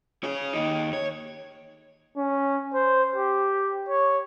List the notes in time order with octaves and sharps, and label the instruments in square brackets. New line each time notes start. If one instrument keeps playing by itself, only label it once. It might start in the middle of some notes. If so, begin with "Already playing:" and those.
[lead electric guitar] G#4 C#5
D#2 D#4
C#5
[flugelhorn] C#4
C5
G4
C#5